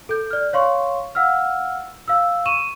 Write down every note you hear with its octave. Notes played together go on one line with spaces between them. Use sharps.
A4 G6
D5 F6
C#5 F5 C6 C#6
F5 F#5 E6 F6
F5 E6
C#6 D#7 E7